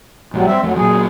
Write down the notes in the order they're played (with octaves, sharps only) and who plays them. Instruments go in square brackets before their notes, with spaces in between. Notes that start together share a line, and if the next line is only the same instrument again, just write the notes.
[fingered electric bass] A#1 G#2 [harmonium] F#3 G3
[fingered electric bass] G3 [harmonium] C4 E5
[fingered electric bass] F2 A3 [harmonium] F#3
[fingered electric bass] A#2 F#3 [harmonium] G#4